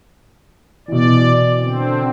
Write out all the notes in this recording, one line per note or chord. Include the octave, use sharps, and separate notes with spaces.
B2 E3 D5
D3 C4